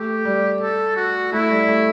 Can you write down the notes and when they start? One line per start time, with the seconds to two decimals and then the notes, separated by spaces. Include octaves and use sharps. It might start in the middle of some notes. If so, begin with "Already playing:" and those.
Already playing: A3 G4
0.25 G3
0.61 A4
0.96 F#4
1.32 A3 E4
1.50 G3
1.68 A3